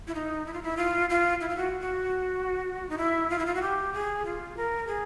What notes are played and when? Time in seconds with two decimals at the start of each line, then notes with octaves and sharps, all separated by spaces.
0.08 E4
0.15 D#4
0.46 E4
0.54 F4
0.63 E4
0.77 F4
1.10 F4
1.41 E4
1.49 F4
1.57 F#4
1.81 F#4
2.89 D#4
2.98 E4
3.30 F4
3.39 E4
3.46 F4
3.55 F#4
3.62 G4
3.93 G#4
4.25 F4
4.57 A#4
4.87 G#4